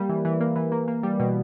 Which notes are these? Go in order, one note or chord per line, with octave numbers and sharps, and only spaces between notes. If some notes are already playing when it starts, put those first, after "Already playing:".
Already playing: G3 A#3
E3
E3
A#3
E3
A#3
A#3
G3
B2